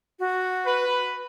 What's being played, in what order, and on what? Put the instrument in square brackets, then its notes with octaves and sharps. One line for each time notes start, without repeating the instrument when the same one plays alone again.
[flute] F#4
[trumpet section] B4